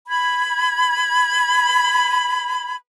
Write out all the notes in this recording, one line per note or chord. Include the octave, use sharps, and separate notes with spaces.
B5 G#6